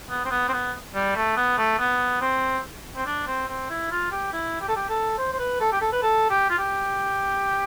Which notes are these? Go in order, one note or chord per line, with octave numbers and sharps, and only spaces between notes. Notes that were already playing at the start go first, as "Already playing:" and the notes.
B3
C4
B3
C4
B3
G3
A3
B3
A3
B3
C4
C4
D4
C4
C4
E4
F4
G4
E4
G4
A4
G4
A4
C5
C5
B4
A4
G4
A4
B4
A4
G4
F4
G4